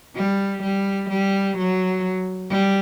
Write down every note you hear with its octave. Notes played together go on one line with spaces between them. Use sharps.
G3
G3
G3
F#3
G3